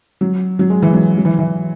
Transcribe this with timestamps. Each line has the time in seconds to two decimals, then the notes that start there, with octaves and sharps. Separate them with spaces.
0.21 F#3
0.59 F#3
0.70 G#3
0.82 E3
0.93 F#3
1.18 F#3
1.25 E3
1.39 E3